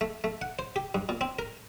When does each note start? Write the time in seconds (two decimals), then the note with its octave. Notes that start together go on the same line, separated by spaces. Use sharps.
0.01 A3
0.24 A3
0.42 F#5
0.59 C5
0.76 G4
0.95 G2
1.09 A#2
1.21 C4
1.39 A#4